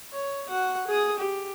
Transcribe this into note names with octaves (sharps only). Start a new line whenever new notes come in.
C#5
F#4 F#5
G#4 D#6
G4